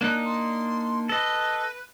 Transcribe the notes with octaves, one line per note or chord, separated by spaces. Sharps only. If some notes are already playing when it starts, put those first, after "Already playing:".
A#3 D4 D#4 F#6
C6
A4 B4 D#5